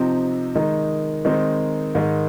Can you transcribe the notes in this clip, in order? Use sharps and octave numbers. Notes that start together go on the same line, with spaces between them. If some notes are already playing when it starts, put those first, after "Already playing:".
Already playing: C3 F3 C4 D#4
D#3 G#3 D#4
D#3 G#3 C4 D#4
G#2 D#3 G#3